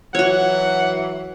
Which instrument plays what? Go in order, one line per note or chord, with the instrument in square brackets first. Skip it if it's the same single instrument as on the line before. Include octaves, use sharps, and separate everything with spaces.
[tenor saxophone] E3 [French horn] F#3 [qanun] F#4 C#5 [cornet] F#5